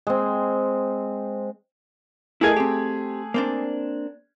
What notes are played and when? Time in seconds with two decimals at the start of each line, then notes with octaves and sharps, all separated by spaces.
0.07 G#3 C4
2.41 A3 E4 G#4 A#4 D#5 G#6
2.56 C4 G4
3.34 A#3 C4 D4